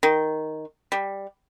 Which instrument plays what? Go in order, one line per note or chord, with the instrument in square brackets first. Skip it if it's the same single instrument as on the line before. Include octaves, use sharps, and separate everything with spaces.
[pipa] D#3
G3